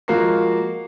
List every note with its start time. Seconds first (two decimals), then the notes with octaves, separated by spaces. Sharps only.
0.08 F3 G#3 A#3 F#4 A#4 C7